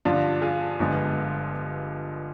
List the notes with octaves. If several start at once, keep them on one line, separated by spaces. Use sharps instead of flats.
G2 D3 F3 D4 F4
F4 G#4
G1 G2 F3 G#3 B3